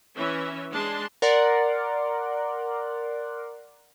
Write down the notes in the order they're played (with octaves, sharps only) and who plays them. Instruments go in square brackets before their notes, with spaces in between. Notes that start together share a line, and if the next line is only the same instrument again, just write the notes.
[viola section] E3 C#4 E5
G#3 D4 A5 C6
[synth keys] A#4 D5 F#5 C6